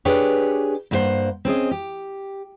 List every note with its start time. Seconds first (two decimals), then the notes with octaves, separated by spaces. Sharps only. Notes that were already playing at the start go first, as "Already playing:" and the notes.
0.05 D4 G4 G#4 B4 C#5
0.91 G2 A#3 F4 A4 C5 F#5
1.45 C4 C#4 G#4 D#5
1.71 G4